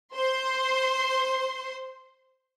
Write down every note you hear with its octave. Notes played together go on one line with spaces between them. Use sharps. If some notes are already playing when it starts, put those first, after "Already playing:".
C5 C6